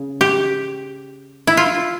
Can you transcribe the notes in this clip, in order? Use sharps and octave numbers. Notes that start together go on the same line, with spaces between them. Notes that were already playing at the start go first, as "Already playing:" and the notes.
Already playing: C#3
G4
E4
F4